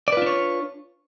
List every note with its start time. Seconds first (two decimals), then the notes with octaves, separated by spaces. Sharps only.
0.08 D5
0.12 B4
0.17 F4
0.22 D4
0.27 C#5